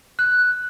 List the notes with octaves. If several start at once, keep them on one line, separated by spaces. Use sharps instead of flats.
F#6